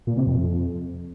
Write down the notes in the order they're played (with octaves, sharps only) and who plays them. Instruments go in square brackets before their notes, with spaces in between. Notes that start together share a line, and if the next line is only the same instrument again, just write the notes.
[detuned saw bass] A#2
C3
F2